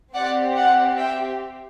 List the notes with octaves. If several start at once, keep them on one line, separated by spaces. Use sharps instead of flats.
C4 G4 D5 F#5
D5 F#5
E5 G5